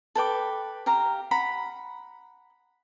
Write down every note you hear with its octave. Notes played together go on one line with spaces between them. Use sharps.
A4 B4 G5 D6
G4 F5 A#5
F#5 A#5 B5